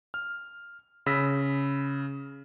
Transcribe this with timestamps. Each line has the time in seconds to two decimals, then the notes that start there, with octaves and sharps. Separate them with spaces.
0.14 F6
1.06 C#3 B5 E6 A#6 B6